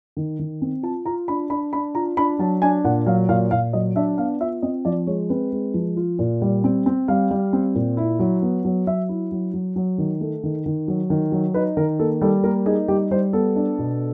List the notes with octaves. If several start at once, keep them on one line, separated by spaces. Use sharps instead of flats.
D#3
D#3
C4
F4 A5
F4 A#5
D4 B5
D4 B5
D4 B5
F4 A#5
D4 B5
F#3 A5
D4 G#5
A#2 F#5
F#3 F5
A#2 F5
A#2 F5
F#3 D#5
D4 E5
B3 F5
F4 E5
C4 D#5
F3 D5
G#3 C#5
C4 B4
G#3
F3
F4
A#2
G3
C4
C4
G3 F5
G3
C4
A#2
E4
F#3
B3
F#3
F#3 E5
E4
F#3
F#3
F#3
D#3
A3
D#3
D#3
F#3
D#3
F#3
D#4 B4
D#3 A#4
A#3 A4
G3 A4
A#3 A#4
D#4 G#4
G3 G4
G3 C5
B3 A4
D4
B2